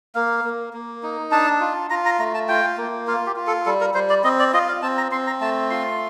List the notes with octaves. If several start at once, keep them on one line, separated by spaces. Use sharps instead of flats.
A#3 F5
A#3
A#3
D#4
D4 A5
F4
F4 A#5
A#5
A3 A#5
A5
F4 G5
A#3
F4 F5
G4
F4
A4
G3 A4
A#4
G3 C5
D5
C4 D#5
D5
F4 D#5
F5
C4 A5
A#5
C4 C6
A#5
A3 A5
F4 C6